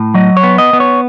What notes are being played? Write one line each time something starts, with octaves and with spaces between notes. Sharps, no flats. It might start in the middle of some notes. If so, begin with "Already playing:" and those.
Already playing: A2
F#3 D#5
C#5
B3
D#5
B3
C#5